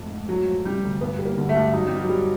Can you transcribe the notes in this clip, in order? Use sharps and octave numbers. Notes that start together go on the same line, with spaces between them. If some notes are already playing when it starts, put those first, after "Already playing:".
Already playing: F2 G#2 F3 A3
G#2
F#3 A3
F3
C3 G3
D2
G2 B3
G3
A#3
D3
A3
G2
F#3 D#4
G3 B3
F#3
G3